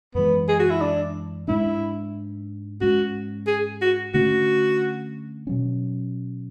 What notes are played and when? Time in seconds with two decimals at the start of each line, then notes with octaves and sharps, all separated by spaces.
0.15 F#2 E3 G#3 B3
0.48 G#4
0.60 F#4
0.70 E4
0.81 D4
1.48 G#2 G#3 D4 E4
2.81 G#2 G#3 C#4 F#4
3.47 G#4
3.81 F#4
4.14 D3 A3 C#4 F#4
5.47 B2 F#3 C#4